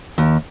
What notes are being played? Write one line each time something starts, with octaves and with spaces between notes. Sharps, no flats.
D#2